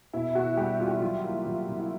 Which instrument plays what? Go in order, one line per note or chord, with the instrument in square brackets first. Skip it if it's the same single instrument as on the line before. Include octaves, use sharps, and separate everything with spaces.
[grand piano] B2 [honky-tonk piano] E4
[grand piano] B2 [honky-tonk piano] F#4
[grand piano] G3 [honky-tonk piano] G4
[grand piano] G3 [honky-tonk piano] F4
[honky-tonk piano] G4
F#4
[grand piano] F#3 [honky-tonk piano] F4
[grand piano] A#3
F#3
C3
[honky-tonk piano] E4